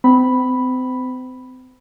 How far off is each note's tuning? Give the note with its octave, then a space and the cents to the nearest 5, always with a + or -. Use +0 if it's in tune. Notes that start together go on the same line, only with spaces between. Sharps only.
C4 -35 B5 +0